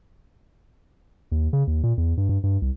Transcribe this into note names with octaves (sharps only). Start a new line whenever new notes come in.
D#2
C#3
D#2
A#2
E2
G2
G2
G2
C2